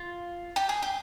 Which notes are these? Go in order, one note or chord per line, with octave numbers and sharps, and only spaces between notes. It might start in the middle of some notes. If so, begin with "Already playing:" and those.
Already playing: F4
G4
G#4
G4